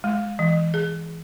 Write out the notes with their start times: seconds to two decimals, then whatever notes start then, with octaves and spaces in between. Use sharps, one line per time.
0.04 G#3
0.39 E3
0.74 G#4